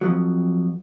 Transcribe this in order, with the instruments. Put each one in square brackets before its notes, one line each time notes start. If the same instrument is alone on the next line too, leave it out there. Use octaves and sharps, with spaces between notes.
[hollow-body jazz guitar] F2 G#2 F3 F#3